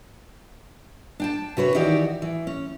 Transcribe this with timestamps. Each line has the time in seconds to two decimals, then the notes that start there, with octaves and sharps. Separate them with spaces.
1.20 D4 G5 A5
1.57 C3 F#4 B4 C#5
1.75 D#3 E3 D#4 F#4 G4 D5
2.22 E3
2.47 C#4